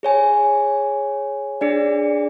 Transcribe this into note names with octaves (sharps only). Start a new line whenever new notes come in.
G#4 C#5 G#5
D4 G#4 D5